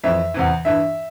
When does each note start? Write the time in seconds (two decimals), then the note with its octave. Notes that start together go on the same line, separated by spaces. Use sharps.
0.04 F2 E3 E5
0.34 E2 C3 E3
0.65 G2 E3 E5